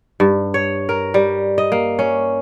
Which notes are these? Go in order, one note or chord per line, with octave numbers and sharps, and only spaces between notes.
G2
C#5
A#4
G3
D#5
A#3
C#4